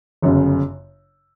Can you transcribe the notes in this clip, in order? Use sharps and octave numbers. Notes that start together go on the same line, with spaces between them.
G1 F#2 C#3